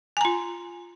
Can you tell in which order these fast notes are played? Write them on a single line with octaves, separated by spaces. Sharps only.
G#5 A#5 F4